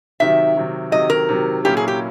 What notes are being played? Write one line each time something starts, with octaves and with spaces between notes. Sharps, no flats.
C3 D#3 F#3 E5
C3 D#3 F#3
C3 D#3 F#3 D#5
A#4
C3 D#3 F#3
A#2 F#3 A#3 C#4 E4 G4
G#4
G4